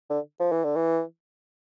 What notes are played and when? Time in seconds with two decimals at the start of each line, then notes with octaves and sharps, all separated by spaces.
0.10 D3
0.39 F3
0.52 E3
0.64 D3
0.76 E3